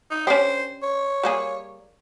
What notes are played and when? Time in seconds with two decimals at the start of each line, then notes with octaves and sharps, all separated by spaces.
0.11 D#4
0.27 C#4 D4 G4 C5
0.83 C#5
1.23 G3 A#3 G#4